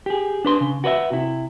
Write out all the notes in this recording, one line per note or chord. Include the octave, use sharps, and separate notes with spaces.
G4 G#4
D4 B4 C6
C#3
F#4 B4 C#5 E5
C3 E4